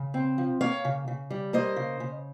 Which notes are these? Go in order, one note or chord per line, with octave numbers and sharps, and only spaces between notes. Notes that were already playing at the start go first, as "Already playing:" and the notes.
Already playing: C#3
C4
F3
A#3 C#5 F5
C#3
C#3
G3
A#3 C5 D#5
C#3
C#3